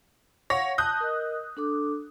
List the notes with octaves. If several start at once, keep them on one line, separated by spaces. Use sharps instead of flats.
C#5 F5 F#5 A#6
A5 D#6 F#6 G6
A#4 D#5
D4 A4 D6